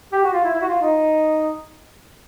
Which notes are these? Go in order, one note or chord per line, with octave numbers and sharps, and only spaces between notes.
G4
F#4
F4
E4
E4
F#4
F4
D#4